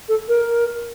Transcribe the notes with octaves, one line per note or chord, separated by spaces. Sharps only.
A4
A#4